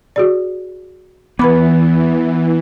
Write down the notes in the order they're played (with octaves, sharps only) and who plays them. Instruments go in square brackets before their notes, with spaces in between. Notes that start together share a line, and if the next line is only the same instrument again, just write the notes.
[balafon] F#4 G#4 D5
[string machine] E3 [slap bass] B3 [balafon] B4 B5 D6